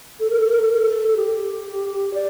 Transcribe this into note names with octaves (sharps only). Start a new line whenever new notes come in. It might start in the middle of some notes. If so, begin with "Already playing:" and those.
A4
A#4
A4
A#4
A4
A#4
A4
A4
G4
D5